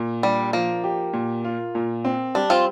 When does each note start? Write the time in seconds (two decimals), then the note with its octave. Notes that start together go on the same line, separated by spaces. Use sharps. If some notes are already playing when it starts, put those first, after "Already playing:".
Already playing: A#2
0.23 G3 D4
0.53 F3 A#3
0.84 G4
1.13 A#2
1.44 F4
1.75 A#2
2.05 C4
2.35 G3 D4
2.50 C4 F4